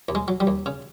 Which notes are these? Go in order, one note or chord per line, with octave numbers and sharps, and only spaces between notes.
D#2
G#3
F#3
G3
D#2
C#3